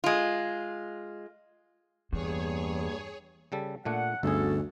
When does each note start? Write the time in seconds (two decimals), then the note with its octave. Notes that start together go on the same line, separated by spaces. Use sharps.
0.04 G#3 F4
2.13 E2 G2 A#3 G#4 C#5
3.52 C#3 G3 A4
3.85 A#2 A3 D4 F#5
4.23 G1 D2 C#4 F#4 G#4 A4